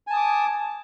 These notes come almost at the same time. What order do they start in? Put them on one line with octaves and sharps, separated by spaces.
G#5 A5 D#6 D6